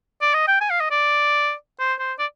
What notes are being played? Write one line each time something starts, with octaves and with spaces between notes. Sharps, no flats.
D5
D#5
G5
G#5
F5
D#5
D5
C5
C5
D5